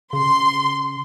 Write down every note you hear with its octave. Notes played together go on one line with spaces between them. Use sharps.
C#3 C6